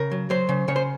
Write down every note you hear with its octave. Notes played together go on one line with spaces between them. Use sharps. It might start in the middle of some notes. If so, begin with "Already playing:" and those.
Already playing: C#3 A#4
F#3
F#3 C5
C#3
C#3 C#5
C5